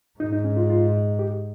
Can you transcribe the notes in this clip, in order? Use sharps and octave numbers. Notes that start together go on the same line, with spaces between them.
G#2 D#4
D#4
C#4
F4
F4
G4